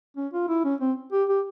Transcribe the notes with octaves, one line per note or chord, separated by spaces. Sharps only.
C#4
F4
E4
C#4
C4
G4
G4